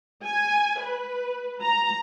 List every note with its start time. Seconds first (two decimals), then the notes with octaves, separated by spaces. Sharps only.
0.25 G#5
0.81 B4
1.62 A#5